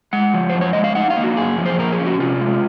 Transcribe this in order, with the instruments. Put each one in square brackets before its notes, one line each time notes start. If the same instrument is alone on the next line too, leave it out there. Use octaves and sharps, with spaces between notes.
[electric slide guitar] G#3 F#5
F3
C5
F#2
C#5
G#3 D#5
F5
D#4 F#5
F5
A#3
F#4
F#2 G#4
F3
C5
A#2 A#4
G#4
C#4
F#4
C3 F4
G#3